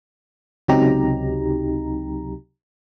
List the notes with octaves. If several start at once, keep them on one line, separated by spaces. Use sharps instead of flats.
C#2 C3 F#3 D#4 G4 A#5